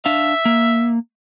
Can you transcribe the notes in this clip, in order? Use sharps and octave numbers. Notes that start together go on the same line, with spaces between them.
D4 E5 F5
A#3